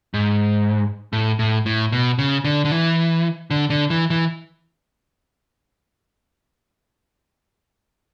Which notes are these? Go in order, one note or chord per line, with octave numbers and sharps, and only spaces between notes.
G#2
A2
A2
A2
B2
C#3
D3
D3
E3
D3
D3
E3
E3